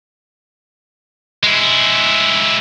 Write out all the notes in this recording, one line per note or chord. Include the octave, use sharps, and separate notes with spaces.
G#3 E4